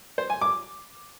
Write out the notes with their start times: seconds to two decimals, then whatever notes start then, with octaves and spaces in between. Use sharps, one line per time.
0.18 C5
0.30 G#5
0.41 D6